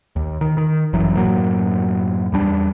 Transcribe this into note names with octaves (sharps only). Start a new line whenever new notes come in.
D#2
D#3
D#3
G1 F#2 E3 F#3
F#2 A2 F#3 A#3
E2 G3 D4